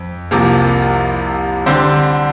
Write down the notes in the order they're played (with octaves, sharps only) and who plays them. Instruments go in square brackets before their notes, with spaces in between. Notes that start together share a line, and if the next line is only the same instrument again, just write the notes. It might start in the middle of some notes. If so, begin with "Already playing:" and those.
Already playing: [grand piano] F2
C2 C3 F3 A#3
D3 G3 C4 G4